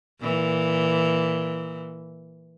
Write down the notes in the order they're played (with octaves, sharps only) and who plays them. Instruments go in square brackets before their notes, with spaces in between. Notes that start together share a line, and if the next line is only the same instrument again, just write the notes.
[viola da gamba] A#2 E3